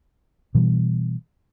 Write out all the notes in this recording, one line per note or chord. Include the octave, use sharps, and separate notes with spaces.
B2 E3 G3